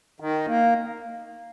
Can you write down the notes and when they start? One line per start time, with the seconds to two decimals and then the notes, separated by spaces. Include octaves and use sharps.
0.20 D#3
0.48 A#3